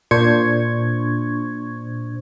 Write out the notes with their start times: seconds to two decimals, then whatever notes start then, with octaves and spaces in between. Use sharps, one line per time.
0.11 A#2 D4 C5 C#6 G#6